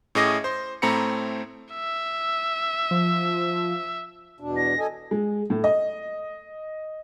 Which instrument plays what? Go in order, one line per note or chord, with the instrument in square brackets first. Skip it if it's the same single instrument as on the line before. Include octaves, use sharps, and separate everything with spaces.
[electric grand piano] A2 C#4 G#4 D#5 D6 A#6
C5 C6
A2 A3 C4 A#5 B5 C#7
[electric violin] E5
[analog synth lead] F3
[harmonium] E2 B2 D4
[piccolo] A#6
[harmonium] A4 D#5 G#5
[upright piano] G#3
A2
D#5